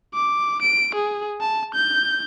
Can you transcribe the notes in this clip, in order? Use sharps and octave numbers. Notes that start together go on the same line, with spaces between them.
D6
D7
G#4
A5
G6